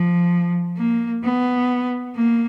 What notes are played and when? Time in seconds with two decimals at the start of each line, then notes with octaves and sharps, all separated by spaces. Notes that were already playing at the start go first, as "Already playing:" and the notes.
Already playing: F3
0.77 A#3
1.24 B3
2.16 A#3